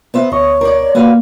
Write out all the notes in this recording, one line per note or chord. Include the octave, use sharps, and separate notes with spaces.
B3 C5 E5
D2 C#5 D#5 C#6
A#4 D5
A#3 F#4 B4 F5